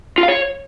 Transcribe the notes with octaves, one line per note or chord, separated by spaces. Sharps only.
F4
F5
C#5